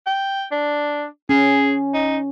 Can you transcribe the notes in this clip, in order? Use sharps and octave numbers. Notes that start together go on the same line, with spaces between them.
G5
D4
C#4 G#4
D#4